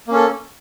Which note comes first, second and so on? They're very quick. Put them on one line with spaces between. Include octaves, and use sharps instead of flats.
A#3 C#4 A4